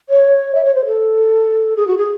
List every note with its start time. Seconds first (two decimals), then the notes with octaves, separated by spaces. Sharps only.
0.09 C#5
0.55 E5
0.65 C#5
0.75 C5
0.85 A4
1.76 G#4
1.87 F#4
1.98 G#4